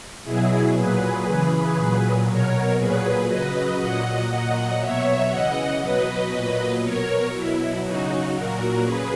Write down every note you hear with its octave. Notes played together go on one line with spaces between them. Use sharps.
B2 F#3 E4 G#4
A#2 F#3 G#4 B4
C#3 E3
A#2 F#3
B2 F#3 A#4 C#5
A#2 F#3 G#4 B4
C#3 F#3 B4 D#5
A#2 F#3 D#5 F#5
A#2 F#3 D#5 F#5
B2 F#3 C#5 E5
C#3 E3 D#5 F#5
B2 F#3 B4 D#5
A#2 F#3
B2 F#3 A#4 C#5
B2 F#3 E4
C#3 F#3 D#4 F#4
A#2 F#3 F#4 A#4
C#3 F#3 G#4 B4